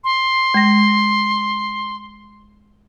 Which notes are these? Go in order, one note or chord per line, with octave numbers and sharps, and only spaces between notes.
C6
G#3 A#6